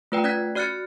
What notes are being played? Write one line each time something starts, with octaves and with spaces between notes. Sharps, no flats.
A3 F4 B4 D5 G5
C#4 D5 F#6 G#6 B6
F#4 D5 F6 F#6 A6 C#7